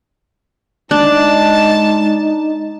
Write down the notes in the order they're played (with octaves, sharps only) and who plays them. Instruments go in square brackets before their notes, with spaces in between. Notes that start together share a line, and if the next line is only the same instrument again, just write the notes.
[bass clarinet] G#3 [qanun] D4 [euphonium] D#4 [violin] A5